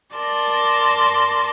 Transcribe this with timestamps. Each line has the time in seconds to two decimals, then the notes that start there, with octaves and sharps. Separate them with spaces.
0.15 A#4 D5 A5 C6